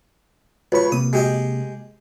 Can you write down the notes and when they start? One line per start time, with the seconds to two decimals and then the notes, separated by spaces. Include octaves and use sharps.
0.72 C#2 B4 C#5 B5 C#6
0.92 C3 A#3 D#6
1.13 G#3 G4 D#5